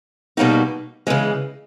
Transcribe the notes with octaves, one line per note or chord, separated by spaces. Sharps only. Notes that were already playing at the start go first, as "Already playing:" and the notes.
B2 G3 A#3 D#4 F#4
C#3 E3 G#3